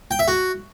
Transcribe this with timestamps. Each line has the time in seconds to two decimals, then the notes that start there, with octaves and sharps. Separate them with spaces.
0.11 G5
0.19 E5
0.28 F#4